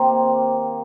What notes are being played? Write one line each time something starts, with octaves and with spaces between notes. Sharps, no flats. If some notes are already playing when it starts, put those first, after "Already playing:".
Already playing: C3 D#3 A#3 C6